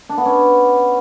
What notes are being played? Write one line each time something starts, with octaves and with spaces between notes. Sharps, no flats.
D4
B3
C#4